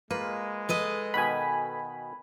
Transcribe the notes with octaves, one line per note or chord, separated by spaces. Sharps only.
G#3 A#3 F4 B4
A4 B4 D#5
B2 D#3 B3 G#5 B5